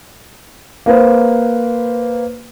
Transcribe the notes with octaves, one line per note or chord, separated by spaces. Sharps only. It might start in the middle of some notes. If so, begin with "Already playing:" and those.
A#3 B4 C5